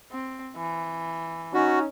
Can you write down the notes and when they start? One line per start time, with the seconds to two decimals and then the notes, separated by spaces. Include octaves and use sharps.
0.11 C4
0.56 E3
1.54 C#4 D#4 F#4